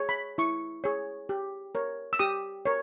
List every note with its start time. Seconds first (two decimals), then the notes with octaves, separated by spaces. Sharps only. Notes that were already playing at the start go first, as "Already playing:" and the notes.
Already playing: G#4 C#5
0.09 B5
0.38 E4 C#6
0.84 G#4 C#5
1.29 G4
1.75 A#4 C#5
2.13 E6
2.19 G4 D#6
2.65 A#4 C#5